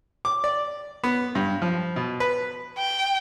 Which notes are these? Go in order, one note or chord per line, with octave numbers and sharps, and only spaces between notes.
D6
D5
B3
G2
F3
B2
B4
G5